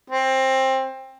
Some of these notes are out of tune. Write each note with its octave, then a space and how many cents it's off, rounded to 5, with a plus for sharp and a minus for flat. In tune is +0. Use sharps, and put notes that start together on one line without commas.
C4 +20